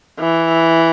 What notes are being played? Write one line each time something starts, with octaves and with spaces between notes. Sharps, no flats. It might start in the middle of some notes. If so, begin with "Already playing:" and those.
E3